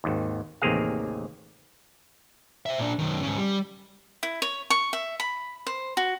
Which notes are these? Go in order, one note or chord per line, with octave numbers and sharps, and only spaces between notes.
G#1 D#2
A1 D#2 C3 A#3 G#4 F5
C5 E5
A#2 D4
F#2 D#3
G#2 C#3
G3
E4
C#5
C#6
E5
B5
C5
F#4